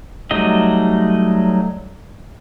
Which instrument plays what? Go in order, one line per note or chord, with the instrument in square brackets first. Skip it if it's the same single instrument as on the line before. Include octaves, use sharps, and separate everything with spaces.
[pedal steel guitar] F#3 G3 A3 D#4 D#5